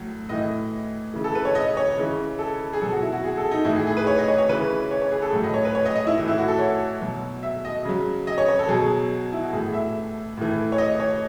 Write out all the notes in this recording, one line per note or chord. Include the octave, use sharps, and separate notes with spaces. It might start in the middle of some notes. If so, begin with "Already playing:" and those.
Already playing: A2 F#3
A2 E3 D#5
C#3 E3
A4
B4
C#5
D#5
C#5
C#3 E3
A4
G#4
B2 F#3 A4
F#4
E4
F#4
G#4
A4
D#4
A2 E3 E4
G#4
G#4
B4
C#5
D#5
C#5
C#5
C#3 E3 B4
C#5
C#5
G#4
A4
A2 F#3
D#5
C#5
B4
C#5
D#5
D#5
E4
A2 E3
E4
F#4
A4
C#5
B2 F#3
E5
D#5
C#3 F#3
D#5
C#5
C#5
A4
B2 F#3 G#4
E4
F#4
A2 E3 G#4
E5
A2 E3
C#5
D#5
C#5